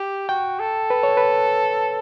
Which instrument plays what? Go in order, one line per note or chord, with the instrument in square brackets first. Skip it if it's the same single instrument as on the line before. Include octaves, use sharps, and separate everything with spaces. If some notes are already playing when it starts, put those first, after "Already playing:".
Already playing: [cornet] G4
[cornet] F#4 [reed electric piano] G5
[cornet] A4
[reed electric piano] B4
C#5
B4